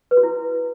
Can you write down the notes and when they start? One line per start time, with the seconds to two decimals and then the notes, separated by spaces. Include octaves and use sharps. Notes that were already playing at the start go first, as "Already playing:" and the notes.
0.11 B4
0.17 F#4
0.23 E4